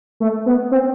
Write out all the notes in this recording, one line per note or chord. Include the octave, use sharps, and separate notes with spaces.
A3
B3
C4